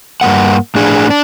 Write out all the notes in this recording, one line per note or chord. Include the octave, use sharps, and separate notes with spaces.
G2 G3 A#3 F#5
A2 D4 G#4
D4